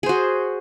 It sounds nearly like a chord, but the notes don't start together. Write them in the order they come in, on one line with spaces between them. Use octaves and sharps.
G#4 C5 F#4